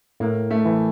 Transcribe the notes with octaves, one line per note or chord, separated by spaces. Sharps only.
A2 A#3
A3
E3